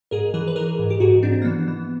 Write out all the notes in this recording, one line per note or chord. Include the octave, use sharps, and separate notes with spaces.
G#2 G#4 A#4
E3 G#4 A#4
B4
E3 G#4 A#4
G#2
G4
G#2 F#4 G#4
G#2 C4 D4
A#3
E3 B3
E3